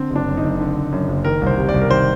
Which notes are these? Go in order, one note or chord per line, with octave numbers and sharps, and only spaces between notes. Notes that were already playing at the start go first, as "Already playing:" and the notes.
Already playing: D3 C4
F#1 D4
F#2
D#4
F#1
D3
F#1
F#2
F#1
D#3 A#4
C2
C5
C3
D5
C2
A#4
D#3 C5